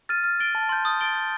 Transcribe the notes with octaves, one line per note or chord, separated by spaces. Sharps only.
F6 A6 D#7
F6
A6 D7 G7
A5
C6 G6
D#6
A6 D7 G7
G6